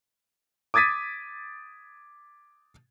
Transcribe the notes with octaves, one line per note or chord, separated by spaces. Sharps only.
D6 D#6 G#6 A6 B6 D#7